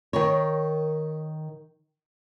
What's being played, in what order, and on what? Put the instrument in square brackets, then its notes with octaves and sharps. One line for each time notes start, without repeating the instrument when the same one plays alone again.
[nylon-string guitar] D#3 A#4 C#5